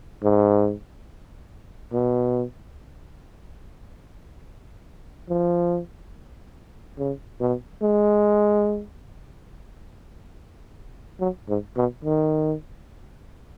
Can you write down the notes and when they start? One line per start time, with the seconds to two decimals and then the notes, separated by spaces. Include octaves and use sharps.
0.23 G#2
1.93 B2
5.29 F3
6.99 C#3
7.40 B2
7.82 G#3
11.20 F#3
11.49 G#2
11.77 B2
12.04 D#3